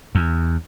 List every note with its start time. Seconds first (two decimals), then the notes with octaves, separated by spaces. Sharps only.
0.15 E2